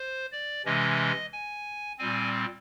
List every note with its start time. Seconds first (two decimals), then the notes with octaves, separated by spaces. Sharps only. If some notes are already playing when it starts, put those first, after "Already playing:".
Already playing: C5
0.32 D5
0.65 C3 E3 G#3 C#4 D#5
1.33 G#5
1.98 A#2 G3 C4 G#5